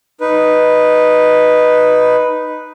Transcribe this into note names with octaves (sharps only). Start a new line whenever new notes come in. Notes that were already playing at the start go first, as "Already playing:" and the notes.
D#4 B4